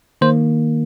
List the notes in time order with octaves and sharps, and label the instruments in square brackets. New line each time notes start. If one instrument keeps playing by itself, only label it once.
[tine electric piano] D#3 A#3 C5